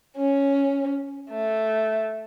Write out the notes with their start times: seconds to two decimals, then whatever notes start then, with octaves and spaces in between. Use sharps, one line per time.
0.17 C#4
1.30 A3